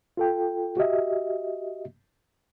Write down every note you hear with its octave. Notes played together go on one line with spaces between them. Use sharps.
F4 A4 G5
F#4 G4 D#5 E5